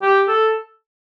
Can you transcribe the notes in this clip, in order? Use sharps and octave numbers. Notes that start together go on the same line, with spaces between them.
G4
A4